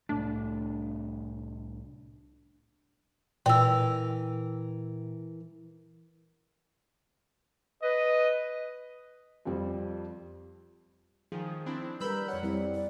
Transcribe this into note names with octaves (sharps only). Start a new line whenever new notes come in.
C2 A2 A3 D4
A#2 E3 A#4 G5 E6
B4 D#5
F2 F3 G3 C4
D#3 F3 G#4
C4 D4 E4
G3 A#4 B4 B5 E6 G6
F2 C#5 F#5
G3 C4 E4
D5